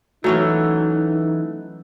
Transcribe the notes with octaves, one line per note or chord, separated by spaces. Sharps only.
E3 F#3 A3 C#4 D#4 F#4